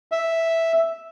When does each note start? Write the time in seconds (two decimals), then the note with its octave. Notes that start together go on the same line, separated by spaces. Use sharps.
0.12 E5